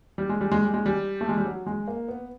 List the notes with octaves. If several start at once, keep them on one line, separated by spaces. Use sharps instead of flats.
G3
G#3
G3
G#3
G3
G#3
G3
A3
G#3
G3
F#3
G#3
A#3
B3